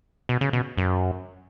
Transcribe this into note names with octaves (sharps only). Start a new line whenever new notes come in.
B2
C#3
B2
F#2